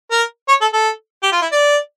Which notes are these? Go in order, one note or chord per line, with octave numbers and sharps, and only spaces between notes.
A#4
C#5
A4
A4
G4
F4
E4
D5